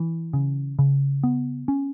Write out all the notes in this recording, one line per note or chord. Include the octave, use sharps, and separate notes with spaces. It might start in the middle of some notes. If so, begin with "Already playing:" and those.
Already playing: E3
C#3
C#3
B3
C#4